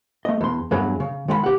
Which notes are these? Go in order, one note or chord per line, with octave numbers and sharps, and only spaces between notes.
A3 D#5
E2 C6
E2 G2 F#3 G#4
C#3
D#3 G#3 F#5 B5
G4 F#5